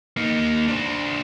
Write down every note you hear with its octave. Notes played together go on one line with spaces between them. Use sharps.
A#3 D#4
D4 C5